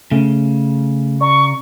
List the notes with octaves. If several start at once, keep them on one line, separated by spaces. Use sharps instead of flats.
C#3 A3 C#4
D5 A#5 C#6